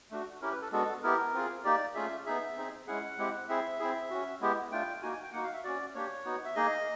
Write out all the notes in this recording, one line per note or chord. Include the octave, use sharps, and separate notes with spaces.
A3 D4 F#4
C#4 E4 G4 A#4
B4
A4
G#3 B3 D4 F#4 A4
B3 E4 G4 A#4
C4 F4 G#4
A#3 D#4 G4 D5
A3 C#4 F4 G#4 E5
B3 D#4 G#4 E5
C4 D#4 G#4
G#3 C#4 E4 G#4 F#5
G#3 C4 E4 G4
C4 E4 G#4 E5
C4 E4 G#4
C#4 F#4
G#3 B3 E4 G4
A3 D4 F4 G5
A#3 D#4 F#4 G#5
G#5
G5
A#3 D#4 F#4 F#5
F5
E5
C#4 F#4 D5
A#3 D4 G4 C#5
B3 D#4 F#4
E5
A#3 D#4 G#4 D#5